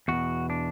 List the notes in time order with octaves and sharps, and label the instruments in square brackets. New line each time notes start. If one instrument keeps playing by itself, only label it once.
[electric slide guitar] E2 B2 F#4
D4